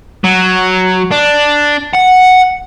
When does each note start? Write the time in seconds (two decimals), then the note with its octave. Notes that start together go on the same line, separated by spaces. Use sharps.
0.24 F#3
1.11 D4
1.93 F#5